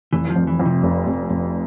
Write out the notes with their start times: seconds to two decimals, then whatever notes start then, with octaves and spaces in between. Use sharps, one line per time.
0.13 F1 E3
0.30 F3
0.36 F2
0.47 E3
0.60 F2
0.65 C3
0.83 F1
1.06 F1
1.30 F1